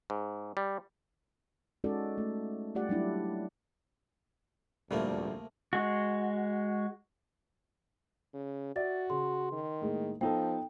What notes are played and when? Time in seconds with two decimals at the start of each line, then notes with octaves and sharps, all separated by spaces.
0.10 G#2
0.57 G3
1.84 G#3 C#4 D#4 F#4 A4 D5
2.18 A3
2.75 G3 A3 F4 G4 D5 F#5
2.89 F#3 G3 D4 E4
4.91 D#1 G#1 D2 C3 F3 G3 A3 A#3
5.73 G#3 F#4
8.34 C#3
8.76 F#4 D5 E5 A6
9.10 C#3 C6
9.52 D#3
9.81 A2 G#3 A#3
10.21 F3 B3 D#4 A4 G5